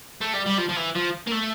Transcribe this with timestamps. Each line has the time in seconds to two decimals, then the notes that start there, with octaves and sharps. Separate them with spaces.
0.21 A3
0.33 G3
0.46 G3
0.58 F3
0.69 F3
0.76 E3
0.95 F3
1.27 A#3
1.31 A3